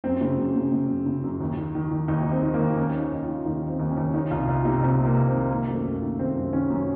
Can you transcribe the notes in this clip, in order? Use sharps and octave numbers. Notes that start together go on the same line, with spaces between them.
F#2 C4
C#3
F#2
C#3
C#3
F#2
C#3
F#2
D#2
D#3
D#3
D#3
D#2 D#4
D#2
C4
D#3
A#3
D#2
D#2 C#4
D#3
D#4
D#2
F4
D#3
D#2 D#4
D#3
C4
D#2
C#4
D#2
D#3 D#4
C2 F4
C2 F4
C3 D#4
C2 C4
C3
A#3
C2
C4
D#3
D#3 A#3
F#2 A#3
A3
F#2
A#3
D#3
D#3 C4
F#2
D#3 C#4
F#2